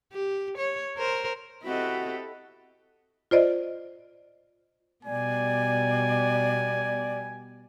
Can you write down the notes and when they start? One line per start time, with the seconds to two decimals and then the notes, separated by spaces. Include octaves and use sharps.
0.13 G4
0.58 C#5
0.97 A#4 C5
1.64 C4 E4 F#4 G4 A4 D#5
3.31 F4 C5 D5 D#5
5.05 B2 G3 B3 D5 G#5